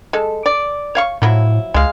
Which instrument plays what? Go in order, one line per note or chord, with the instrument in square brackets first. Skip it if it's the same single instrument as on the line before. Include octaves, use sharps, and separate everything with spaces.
[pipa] G#3 A4
D5
C#5 F5 C#6
[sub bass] A2 [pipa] F3 F#3 E4
[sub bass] C#2 [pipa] G#3 F5